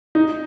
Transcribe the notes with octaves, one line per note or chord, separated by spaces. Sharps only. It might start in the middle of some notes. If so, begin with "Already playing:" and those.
D#4